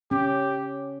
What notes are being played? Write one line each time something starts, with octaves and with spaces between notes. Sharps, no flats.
C#4 G4